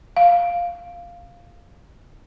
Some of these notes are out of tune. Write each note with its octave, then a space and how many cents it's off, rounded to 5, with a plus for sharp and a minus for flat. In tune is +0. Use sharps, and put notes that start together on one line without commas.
F5 +0